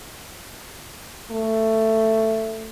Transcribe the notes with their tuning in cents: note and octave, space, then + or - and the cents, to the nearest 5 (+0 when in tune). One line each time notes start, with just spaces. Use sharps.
A3 +10